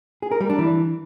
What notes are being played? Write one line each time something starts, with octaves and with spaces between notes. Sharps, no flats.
G#4
A#4
G3
D4
E3